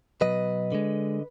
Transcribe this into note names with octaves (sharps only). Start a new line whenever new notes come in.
B2 F#3 B4 D#5
D3 G#3